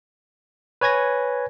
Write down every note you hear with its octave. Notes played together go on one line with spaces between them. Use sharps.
B4 C#5 G#5 G#6 A#6